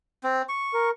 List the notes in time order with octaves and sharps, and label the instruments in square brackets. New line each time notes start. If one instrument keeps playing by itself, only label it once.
[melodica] C4
C#6
[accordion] A#4